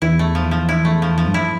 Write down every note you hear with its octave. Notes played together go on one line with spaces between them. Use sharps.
E2 E4
A3
F3
F3
E4
A3
F3
F3
G2
E4